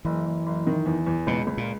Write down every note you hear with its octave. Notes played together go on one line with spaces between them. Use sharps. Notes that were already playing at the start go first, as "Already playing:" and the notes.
F#1 E3
F#1
F#1
D#3
E2
E2
C#2 B2
C#2
A#2